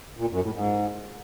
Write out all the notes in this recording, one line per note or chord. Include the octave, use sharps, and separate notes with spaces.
A#2
F#2
A2
G#2